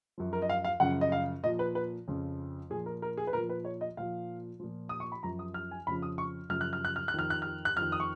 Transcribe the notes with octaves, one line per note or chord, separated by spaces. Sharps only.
F#2 F3
A#4
D#5
F5
F5
F#2 C#3 F3 F#5
D#5
F5
A#2 F3 D#5
B4
B4
F2 C#3 F3
A#2 F3 G#4
A#4
A#4
G#4
B4
A#2 F3 A#4
B4
C#5
D#5
A#2 F3 F5
A#2 F3
D#6
C#6
B5
F#2 F3 A#5
D#6
F6
G#5
F2 C#3 F3 B5
D#6
C#6
F#2 C#3 F3 F6
F#6
F6
F#6
F6
F#6
F2 D#3 F6
F#6
F6
F#6
F2 D#3 F6
D#6
C#6